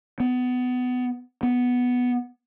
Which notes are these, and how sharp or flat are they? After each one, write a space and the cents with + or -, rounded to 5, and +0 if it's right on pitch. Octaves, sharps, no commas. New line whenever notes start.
B3 +20
B3 +0